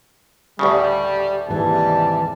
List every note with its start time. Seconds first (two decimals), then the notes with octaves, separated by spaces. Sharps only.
0.59 D2 A2 C#3 G3
1.49 D#2 G#2 C3 E3 G3 A5